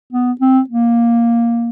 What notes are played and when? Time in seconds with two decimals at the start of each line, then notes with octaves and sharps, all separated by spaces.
0.12 B3
0.40 C4
0.69 A#3